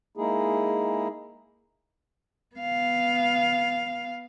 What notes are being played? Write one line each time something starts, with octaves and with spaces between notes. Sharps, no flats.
G#3 A#3 D#4 E4 G#4
B3 F5